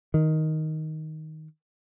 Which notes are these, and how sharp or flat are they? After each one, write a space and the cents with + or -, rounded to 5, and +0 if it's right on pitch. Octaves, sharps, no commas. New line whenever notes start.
D#3 +5